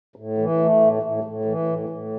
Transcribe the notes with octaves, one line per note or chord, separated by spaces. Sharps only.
A2
E3
A3
A2
A2
A2
E3
A2
A2